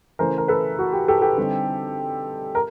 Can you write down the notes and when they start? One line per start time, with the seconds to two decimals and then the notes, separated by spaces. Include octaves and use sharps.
0.19 C#3 E3 A3 A#4 C5
0.38 A#4
0.48 A4 B4
0.79 F#4
0.93 G4
1.08 G4 A4
1.22 G4 A4
1.37 D3 G3 C4 D#4
2.55 A#4